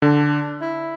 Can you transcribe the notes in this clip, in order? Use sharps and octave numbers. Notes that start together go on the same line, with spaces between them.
D3 D4
E4